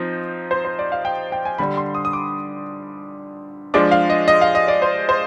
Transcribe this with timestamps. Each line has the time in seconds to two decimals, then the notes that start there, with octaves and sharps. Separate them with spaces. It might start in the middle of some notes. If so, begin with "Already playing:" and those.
Already playing: F3 C4 D#4
0.51 C5
0.65 C5
0.79 D5
0.92 F5
1.05 G5
1.32 G5
1.45 G#5
1.58 D3 G3 D4 B5
1.77 C6
1.95 D#6
2.05 D#6
2.13 D6
3.74 F3 G#3 D4 D6
3.91 F5
4.10 D#5
4.28 D#5
4.41 F5
4.55 D#5
4.68 D5
4.82 C5
5.09 C5